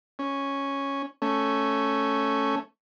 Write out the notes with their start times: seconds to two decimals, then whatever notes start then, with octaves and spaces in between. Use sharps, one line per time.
0.19 C#4
1.22 A3 C#4